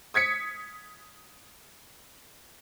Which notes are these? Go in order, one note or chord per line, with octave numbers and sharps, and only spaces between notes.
D#6 G#6 B6 C#7